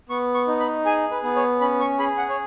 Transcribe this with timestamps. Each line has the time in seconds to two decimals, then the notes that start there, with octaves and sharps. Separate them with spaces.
0.09 B3 C#6
0.34 C#6
0.47 D#4
0.60 B5
0.85 G#4 G#5
1.11 B4
1.23 B3
1.36 C#5
1.61 C#4 B5
1.80 C#6
1.99 G#4 B5
2.18 F#5
2.30 C#5